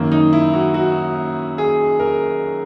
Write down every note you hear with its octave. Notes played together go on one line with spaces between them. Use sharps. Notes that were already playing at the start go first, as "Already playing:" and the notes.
Already playing: F#2 D#3 A#3
D#4
E4
F#4
F#4
G#4
A#4